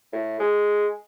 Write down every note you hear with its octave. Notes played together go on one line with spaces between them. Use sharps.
A2
G#3